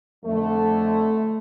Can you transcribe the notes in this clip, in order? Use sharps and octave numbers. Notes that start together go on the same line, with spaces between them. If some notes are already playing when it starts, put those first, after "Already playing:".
F2 D3 A3